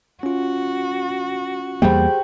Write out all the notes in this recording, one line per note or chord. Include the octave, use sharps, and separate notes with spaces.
C#4 F4 F#4
E2 G3 A#3 G4 G#4 C5 G5 B5